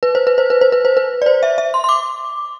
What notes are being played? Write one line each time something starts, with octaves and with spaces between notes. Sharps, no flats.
B4
C5
B4
C5
B4
C5
B4
C5
B4
D5
C5
E5
E5
C6
C6
D6